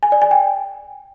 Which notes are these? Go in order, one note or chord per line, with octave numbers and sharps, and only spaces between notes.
G#5
D5
G#5
G5